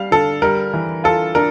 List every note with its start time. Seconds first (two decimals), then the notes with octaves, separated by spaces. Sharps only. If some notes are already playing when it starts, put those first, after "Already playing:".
Already playing: G3 F5
0.11 D3 A4
0.42 G3 A#4
0.73 E3
1.04 F4 A4
1.35 D4 A#4